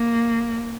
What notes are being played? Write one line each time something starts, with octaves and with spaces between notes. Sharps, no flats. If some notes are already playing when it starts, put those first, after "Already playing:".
Already playing: A#3